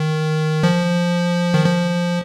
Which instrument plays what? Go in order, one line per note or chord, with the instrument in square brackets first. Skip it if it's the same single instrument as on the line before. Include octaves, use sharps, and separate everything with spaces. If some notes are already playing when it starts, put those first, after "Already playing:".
Already playing: [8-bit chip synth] D#3
F3
D#3
F3